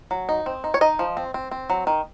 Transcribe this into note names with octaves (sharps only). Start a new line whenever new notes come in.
F#3
D#4
C4
D#4
C#5
D#4 D#5
F3
C4
C4
C4
F#3
D#3